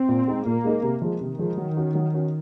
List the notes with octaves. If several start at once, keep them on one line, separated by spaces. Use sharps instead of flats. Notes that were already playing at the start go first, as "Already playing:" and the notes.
Already playing: C4
A#2
G#3 D#4 G#4
A#2 A#3
G#3 D#4 G#4
C3
F3 G#3
C3 D#3
F3 G#3
F#3
C#4 F#4
F#3
C#4 F#4